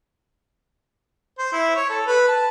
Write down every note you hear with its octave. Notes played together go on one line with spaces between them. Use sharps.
C5
E4
C#5
A4
B4
A5